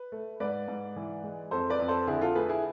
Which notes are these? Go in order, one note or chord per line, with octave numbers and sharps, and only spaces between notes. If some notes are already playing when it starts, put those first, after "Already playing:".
Already playing: B4
A3
G#2 B4 D5
G#2
E3
G#3
F2 A4 C5
B4 D5
F2
A4 C5
D3 E4 G#4
F4 A4
A3 G#4 B4
E4 G#4